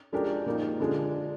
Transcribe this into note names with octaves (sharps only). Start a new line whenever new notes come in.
F3 G#3 D4 G4 A#4
A#2 F3 A#3 D#4
D3 F3 G#3 D4